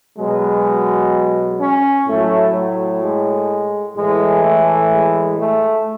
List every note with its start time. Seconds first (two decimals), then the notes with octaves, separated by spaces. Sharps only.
0.17 B2 F#3 G#3
1.59 C#4
2.06 A2 F#3 A3
2.54 F#3
3.01 G#3
3.95 A2 E3 G#3
4.42 A3
4.90 G#3
5.37 A3